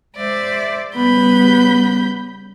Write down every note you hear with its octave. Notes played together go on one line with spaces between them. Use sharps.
G#3 C5 D5 E5
C#3 G3 B3 B5 G6